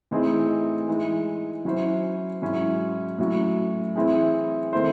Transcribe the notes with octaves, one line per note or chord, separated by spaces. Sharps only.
A2 E3 C4 D#4 G#4
E3 G#3 D#4
F#3 C#4 E4 C5
G#2 F#3 C#4 E4
A2 F#3 C#4 F#4
E3 C4 E4 G#4
D#3 A3 C4 E4 C5